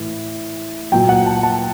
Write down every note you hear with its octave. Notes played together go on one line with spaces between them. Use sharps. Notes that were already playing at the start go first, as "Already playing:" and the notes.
Already playing: A2 E3
A#2 F#3 G5
F#5
A5
A5